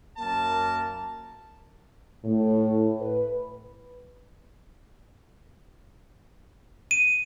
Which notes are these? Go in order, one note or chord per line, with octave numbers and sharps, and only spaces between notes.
F#2 A#3 A#4 A5
A2
B4
D#7